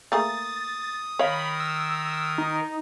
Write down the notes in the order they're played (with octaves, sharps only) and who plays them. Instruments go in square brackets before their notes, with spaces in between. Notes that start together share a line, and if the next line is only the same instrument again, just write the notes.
[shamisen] A3 A#3 G#4 [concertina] D#6 [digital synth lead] A6
[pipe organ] D#3 A#4 [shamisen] C#5 F5 [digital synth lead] B5
[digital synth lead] E6
D#4